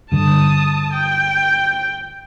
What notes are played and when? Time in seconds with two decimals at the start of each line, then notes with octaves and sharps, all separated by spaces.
0.12 G2 D3 A5 D#6
0.93 G5